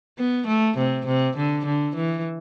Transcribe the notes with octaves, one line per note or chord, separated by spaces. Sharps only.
B3
A3
C3
C3
D3
D3
E3